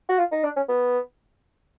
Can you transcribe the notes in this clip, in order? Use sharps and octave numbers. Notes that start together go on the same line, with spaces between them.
F#4
F4
D#4
D4
C#4
B3